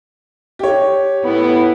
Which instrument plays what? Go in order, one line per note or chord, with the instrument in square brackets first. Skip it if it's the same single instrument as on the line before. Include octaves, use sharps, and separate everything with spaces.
[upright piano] G4 C#5
[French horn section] A2 B3 [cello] E4